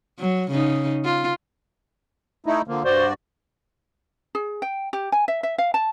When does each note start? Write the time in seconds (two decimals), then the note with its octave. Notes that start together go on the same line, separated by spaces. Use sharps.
0.19 F#3
0.51 C#3 D#4
1.05 F4
2.46 A3 D#4 E4
2.68 D3 F3 A#3
2.85 G2 F#4 C5 D5
4.35 G#4
4.62 G5
4.93 G4
5.12 G#5
5.28 E5
5.43 E5
5.58 F5
5.74 A5